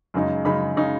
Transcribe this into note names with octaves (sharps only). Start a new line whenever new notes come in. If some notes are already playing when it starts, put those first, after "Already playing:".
F#2 C#3 G#3 D#4
F#2 C#3 G#3 D#4 B5
C#3 G#3 D#4